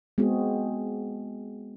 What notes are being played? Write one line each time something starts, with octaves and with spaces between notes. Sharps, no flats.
G#3 B3 C4 F#4 G#4